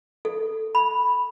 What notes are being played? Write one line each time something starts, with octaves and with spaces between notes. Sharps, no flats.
A4
B5